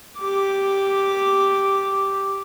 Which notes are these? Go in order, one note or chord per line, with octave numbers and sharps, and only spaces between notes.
G4 D6